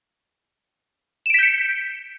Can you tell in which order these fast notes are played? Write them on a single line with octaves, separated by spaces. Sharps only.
E7 D7 B6 G6 C#7